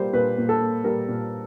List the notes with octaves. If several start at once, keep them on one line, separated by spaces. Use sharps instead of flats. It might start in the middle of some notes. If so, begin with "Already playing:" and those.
Already playing: A#2 G3 A#3 C5
A#2 B4
A#2
A4
A#3
G3 A#4
A#2